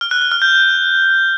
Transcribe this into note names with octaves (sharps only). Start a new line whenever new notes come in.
F6
F#6
F#6
F6
G6